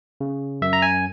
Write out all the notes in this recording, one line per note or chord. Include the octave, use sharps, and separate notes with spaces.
C#3
F#2 E5
A#5
G#5